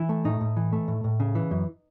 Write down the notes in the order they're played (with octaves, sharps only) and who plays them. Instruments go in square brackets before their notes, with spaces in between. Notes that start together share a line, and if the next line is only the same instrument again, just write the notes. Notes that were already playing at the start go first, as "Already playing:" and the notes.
Already playing: [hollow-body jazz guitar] E3 E4
A3
A2 D#4
A2
E3
A3
A2
A2
C#3
E3
F#2